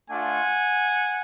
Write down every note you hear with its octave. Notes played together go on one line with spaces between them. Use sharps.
A3 D4 F4 F#5 G#5